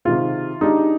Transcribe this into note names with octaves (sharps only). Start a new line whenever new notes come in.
C3 D#3 G#3 F4
G#3 D4 D#4 G4